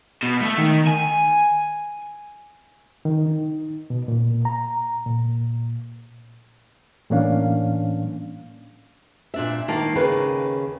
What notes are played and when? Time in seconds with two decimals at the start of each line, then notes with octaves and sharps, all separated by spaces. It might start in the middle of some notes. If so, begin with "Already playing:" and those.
0.23 B2
0.42 A3
0.58 D#3
0.87 G#5
3.05 D#3
3.26 D#4
3.90 B2
4.08 A#2
4.45 A#5
5.06 A#2
7.10 A2 E3 A#3 C#4 D4 F5
9.34 A#2 D4 E5
9.68 D#3 A#3 A5
9.96 D#2 C#3 A#4 B4